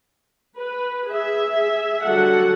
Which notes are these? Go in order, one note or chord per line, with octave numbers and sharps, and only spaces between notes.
B4
G#4 E5
D3 F#3 G3 F#4 A4 F#5